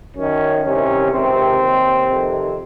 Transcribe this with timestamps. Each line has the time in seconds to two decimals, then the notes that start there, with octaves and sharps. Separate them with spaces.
0.16 F#2 D#3 C#4
0.63 C2 C3 D#3 C#4
1.11 C#2 C3 D#3 C4
1.58 D#2 D#3
2.06 F2 C3 D#3